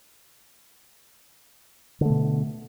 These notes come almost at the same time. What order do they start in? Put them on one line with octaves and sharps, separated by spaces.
D3 A3 B2